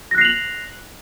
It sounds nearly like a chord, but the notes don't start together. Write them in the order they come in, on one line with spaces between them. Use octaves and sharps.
A#6 F#6 C7 F7 F#7